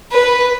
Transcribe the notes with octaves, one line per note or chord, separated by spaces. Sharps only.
B4